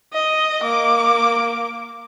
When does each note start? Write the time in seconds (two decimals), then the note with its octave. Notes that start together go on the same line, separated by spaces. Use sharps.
0.13 D#5
0.62 A#3 D6